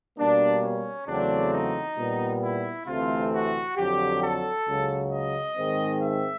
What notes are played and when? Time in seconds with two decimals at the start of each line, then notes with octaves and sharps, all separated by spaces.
0.17 B2 G3 A#3 D4
0.63 C#4
1.07 E2 C#3 F#3 A3 C4 D4
1.52 D#4
1.97 A#2 G3 B3
2.42 E4
2.86 D2 C3 E3 A3 C4 F4
3.32 F#4
3.76 F2 D3 F#3 G4
4.22 A4
4.66 C#2 C#3 F#3
5.12 D#5
5.57 G#2 D#3 G#3 C4
6.01 E5